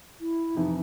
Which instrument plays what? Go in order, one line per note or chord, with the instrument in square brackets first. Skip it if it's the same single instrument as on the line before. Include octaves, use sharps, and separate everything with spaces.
[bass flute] E4
[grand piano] F2 C3 E3 [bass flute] D#4